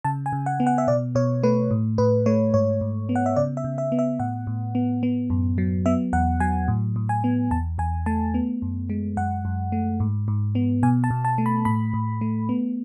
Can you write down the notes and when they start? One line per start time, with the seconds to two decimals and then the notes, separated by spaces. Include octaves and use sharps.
0.05 C#3 A5
0.26 G#5
0.33 C#3
0.46 F#5
0.60 B3
0.67 F#5
0.78 E5
0.88 B2 D5
1.15 B2 C#5
1.43 A3 B4
1.71 A2
1.98 A2 B4
2.26 A3 C#5
2.54 G#2 C#5
2.81 G#2
3.09 B3
3.16 F#5
3.26 E5
3.36 C#3 D5
3.57 E5
3.64 C#3
3.78 E5
3.92 B3
3.99 E5
4.20 A2 F#5
4.47 A2
4.75 B3
5.03 B3
5.30 F#2
5.58 F#3
5.86 B3 E5
6.13 E2 F#5
6.40 F#3 G#5
6.68 A2
6.96 A2
7.09 G#5
7.24 B3
7.51 E2 A5
7.78 E2 G#5
8.06 A3 A5
8.34 B3
8.62 F#2
8.90 G#3
9.17 F#2 F#5
9.45 F#2
9.72 A3
10.00 G#2
10.28 G#2
10.55 B3
10.83 B2 G#5
11.04 A5
11.11 B2
11.25 A5
11.38 A3
11.46 B5
11.65 A2 B5
11.94 A2
12.21 A3
12.49 B3